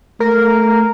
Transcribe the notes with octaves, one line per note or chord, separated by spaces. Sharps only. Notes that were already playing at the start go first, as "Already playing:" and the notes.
A3 A#4